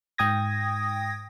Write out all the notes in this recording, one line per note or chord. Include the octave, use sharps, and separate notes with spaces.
G#2 G5 D#6 G#6 A#6